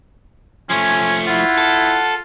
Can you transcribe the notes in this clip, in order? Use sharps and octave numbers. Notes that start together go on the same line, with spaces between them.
F3 A3 C#4 G#5
E4 F4 F#5
A4